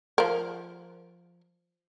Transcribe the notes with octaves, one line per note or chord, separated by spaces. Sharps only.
F3 A#4